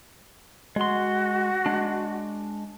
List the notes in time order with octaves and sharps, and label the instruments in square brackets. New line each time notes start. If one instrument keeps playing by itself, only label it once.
[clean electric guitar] G#3 C6 [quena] F#4
[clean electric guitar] G#3 D4